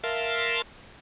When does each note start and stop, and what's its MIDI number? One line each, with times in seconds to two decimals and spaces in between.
0.04 0.62 70
0.04 0.62 76
0.04 0.62 77
0.04 0.62 81
0.04 0.62 84